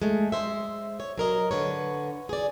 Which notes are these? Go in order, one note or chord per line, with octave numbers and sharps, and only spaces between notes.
G#3 A3
G#3 C5 E5
C#5
F#3 A#4 D#5
D3 B4 C#5
G#4 D5